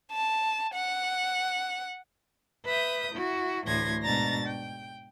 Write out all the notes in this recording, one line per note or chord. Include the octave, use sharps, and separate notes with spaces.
A5
F#5
B4 E5 D#6 G6
E4 F#4
D2 A2 E3 C6 G#6 A#6
G#2 B2 D4 A#5 A6 A#6
G5